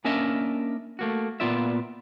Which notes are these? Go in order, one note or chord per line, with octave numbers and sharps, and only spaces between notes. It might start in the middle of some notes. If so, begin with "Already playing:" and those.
A#3 C#4 D4 A#4 D#5 E5
A3 A#3 F#4
A#2 B3 F4 D5 E5